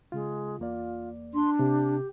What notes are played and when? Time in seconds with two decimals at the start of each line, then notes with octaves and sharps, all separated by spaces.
0.12 C#3 G#3 F4
0.60 E2 A#3 F4 D5
1.34 D4 C6
1.59 C3 G4